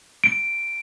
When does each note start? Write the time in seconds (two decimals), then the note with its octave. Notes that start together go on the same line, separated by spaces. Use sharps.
0.24 D7